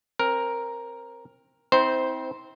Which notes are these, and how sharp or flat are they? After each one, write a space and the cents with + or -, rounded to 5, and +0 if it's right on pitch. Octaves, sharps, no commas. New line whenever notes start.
C4 +25 A#4 +5
C4 -10 E4 -45 C5 +0